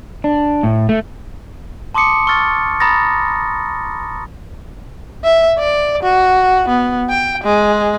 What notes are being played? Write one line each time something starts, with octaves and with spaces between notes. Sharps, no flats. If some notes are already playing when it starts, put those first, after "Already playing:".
D4
A2
A3
A5 C6 D6 D#6 C#7
C#6 E6 F6 A6
A#5 B5 D#6 A6 A#6
E5
D5
F#4
B3
G5
G#3